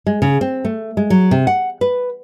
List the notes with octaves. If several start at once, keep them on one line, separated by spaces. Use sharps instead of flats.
G#3
C#3
C4
A3
G#3
F#3
C3
F#5
B4